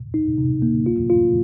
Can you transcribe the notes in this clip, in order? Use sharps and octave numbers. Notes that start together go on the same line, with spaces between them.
D#4
C3
A#3
F4
F4